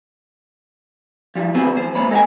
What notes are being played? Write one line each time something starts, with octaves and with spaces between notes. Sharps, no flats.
F3 G3 E4
D2 B3 C4 F#4 G#4 B4
E3 C5
G#3 A#3 B3 C#5 B5
A4 D#5 F5 G5 G#5